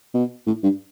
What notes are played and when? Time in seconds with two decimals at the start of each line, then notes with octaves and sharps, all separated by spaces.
0.14 B2
0.47 A2
0.63 G2